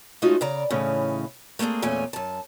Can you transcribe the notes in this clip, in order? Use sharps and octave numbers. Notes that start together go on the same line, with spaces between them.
G#3 A3 C#4 D#4 F4 F#4
C#3 D5 A#5
A2 C#3 E3 C#4 D#4
A3 A#3 C4 D4 G#4
E2 A#2 A3 C#4 G#5
F#2 A5